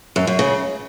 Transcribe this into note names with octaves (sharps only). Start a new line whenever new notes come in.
F#2
F#2
C#3